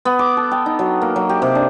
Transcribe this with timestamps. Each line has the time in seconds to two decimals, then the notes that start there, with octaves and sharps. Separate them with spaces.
0.05 B3
0.19 D6
0.37 A4
0.51 G5
0.66 D#4
0.79 F#3
1.02 A#3
1.16 F#3
1.29 G4
1.42 C3
1.55 D4